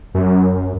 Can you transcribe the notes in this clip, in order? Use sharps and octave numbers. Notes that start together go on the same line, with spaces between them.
F#2